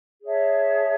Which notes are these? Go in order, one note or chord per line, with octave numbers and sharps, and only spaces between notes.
G#4 C#5 E5 A5